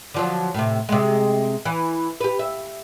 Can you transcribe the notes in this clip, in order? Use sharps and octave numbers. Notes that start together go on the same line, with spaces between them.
D3 F3 F#3
A2 C3
C3 G#3
E3
G4 B4
E5